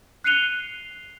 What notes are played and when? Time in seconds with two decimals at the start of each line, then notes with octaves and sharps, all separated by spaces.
0.24 F#6 C7 C#7 D#7 F7 G7